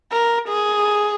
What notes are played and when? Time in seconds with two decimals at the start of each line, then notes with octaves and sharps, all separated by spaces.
0.12 A#4
0.49 G#4